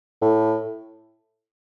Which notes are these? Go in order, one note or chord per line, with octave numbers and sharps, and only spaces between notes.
A2